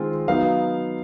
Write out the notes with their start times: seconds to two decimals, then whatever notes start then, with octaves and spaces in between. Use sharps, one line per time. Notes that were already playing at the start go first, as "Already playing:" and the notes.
Already playing: D#3 G#3 C4 F4
0.28 F#3 B3 D#4 F5